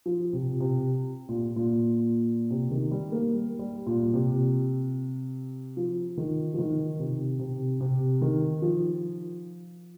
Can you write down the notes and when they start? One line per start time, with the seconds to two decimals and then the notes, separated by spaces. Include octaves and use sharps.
0.06 F3
0.33 C3
0.60 C3
1.29 A#2
1.56 A#2
2.50 C3
2.71 D#3
2.91 G3
3.12 A#3
3.33 G3
3.59 G3
3.86 A#2
4.14 C3
5.77 F3
6.17 D#3
6.54 F3
6.58 D#3
6.99 C3
7.39 C3
7.81 C3
8.22 D#3
8.62 F3